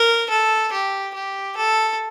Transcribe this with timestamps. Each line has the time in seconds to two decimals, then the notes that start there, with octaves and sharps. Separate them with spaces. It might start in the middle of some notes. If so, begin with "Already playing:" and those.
Already playing: A#4
0.30 A4
0.73 G4
1.14 G4
1.57 A4